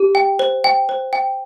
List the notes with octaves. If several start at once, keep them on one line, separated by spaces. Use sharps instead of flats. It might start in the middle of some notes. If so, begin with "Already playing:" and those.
Already playing: G4
G5
C5
G5
C5
G5